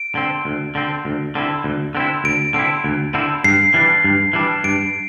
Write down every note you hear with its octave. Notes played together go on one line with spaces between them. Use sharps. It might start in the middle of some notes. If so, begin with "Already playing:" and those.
Already playing: D7
D3 C4
D2
D3 C4
D2
D3 C4 E4
D2
D3 C4 E4
D2 D7
D3 C4 E4
D2
D3 C4 E4
G2 C7
E3 G3 D4
G2
E3 G3 D4
G2 D7